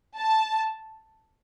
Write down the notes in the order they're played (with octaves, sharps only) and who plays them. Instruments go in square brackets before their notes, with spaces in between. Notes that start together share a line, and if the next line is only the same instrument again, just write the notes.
[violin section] A5